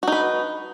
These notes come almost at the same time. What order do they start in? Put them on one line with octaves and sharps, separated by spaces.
F#4 D#4 B4